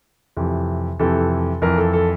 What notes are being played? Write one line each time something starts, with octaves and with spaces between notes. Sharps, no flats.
F2 C3 E3
F2 C3 E3 A4
F2 E3 A#4
A4
A4